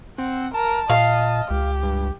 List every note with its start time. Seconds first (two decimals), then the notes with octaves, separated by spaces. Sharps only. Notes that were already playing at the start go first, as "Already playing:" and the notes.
0.18 C4 F#5
0.54 A#4 A5
0.90 A#2 D#5 F5
1.51 C#2 G4
1.83 G2